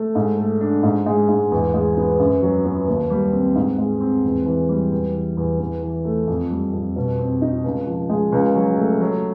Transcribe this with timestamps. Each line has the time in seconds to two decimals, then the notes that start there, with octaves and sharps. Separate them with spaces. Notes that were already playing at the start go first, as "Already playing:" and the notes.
Already playing: A3
0.15 G#2
0.38 A3
0.61 D4
0.83 G#2
1.06 G#3
1.28 G#2
1.51 E2
1.74 G#3
1.97 B3
2.19 F#2
2.42 F#3
2.65 B3
2.88 D#2
3.10 G3
3.33 C4
3.56 G#2
3.78 G#3
4.01 C4
4.24 E2
4.46 E3
4.69 G3
4.92 E2
5.14 E3
5.37 E2
5.60 E2
5.83 E3
6.05 A3
6.27 F2
6.51 G3
6.73 F2
6.96 B2
7.19 C4
7.42 D#4
7.64 C#2
7.87 F3
8.09 G#3
8.32 C#2
8.55 F#3
8.77 A3
9.01 F#3